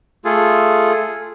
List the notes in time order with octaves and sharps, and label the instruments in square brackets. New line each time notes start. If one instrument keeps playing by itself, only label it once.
[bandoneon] A3 F4 G#4 A4